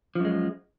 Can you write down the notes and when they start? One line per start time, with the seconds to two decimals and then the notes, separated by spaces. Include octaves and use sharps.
0.15 F3
0.20 F#2
0.25 G#3